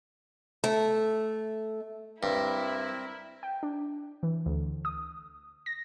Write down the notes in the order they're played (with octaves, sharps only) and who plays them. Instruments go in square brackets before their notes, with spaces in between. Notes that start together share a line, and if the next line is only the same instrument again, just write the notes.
[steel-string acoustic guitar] A3
[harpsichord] G2 [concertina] C4 A#4 [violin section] E4
[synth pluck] G5
D4
E3
D2
D#6
A#6